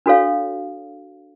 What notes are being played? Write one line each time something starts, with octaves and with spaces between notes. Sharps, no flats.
D4 F#4 A4 C#5 F5